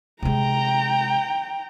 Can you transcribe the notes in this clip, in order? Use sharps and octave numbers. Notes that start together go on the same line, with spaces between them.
C3 G#3 G5 A#5